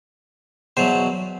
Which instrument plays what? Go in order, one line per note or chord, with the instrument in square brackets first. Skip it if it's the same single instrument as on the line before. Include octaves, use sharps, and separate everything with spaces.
[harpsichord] E2 B2 F#3 C5